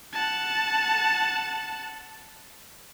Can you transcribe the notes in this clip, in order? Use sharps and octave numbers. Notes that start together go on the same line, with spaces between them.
F#5 A5